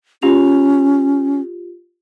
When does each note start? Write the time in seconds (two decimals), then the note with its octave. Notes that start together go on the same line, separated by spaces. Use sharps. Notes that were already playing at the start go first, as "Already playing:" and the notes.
0.22 C#4 F4 G4 F7